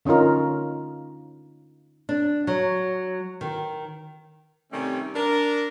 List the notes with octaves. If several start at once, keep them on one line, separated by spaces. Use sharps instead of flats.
D3 C#4 D#4 F4 A#4
D4
F#3
D#3
C3 D#3 G3 A3 C4 C#4
D4 A#4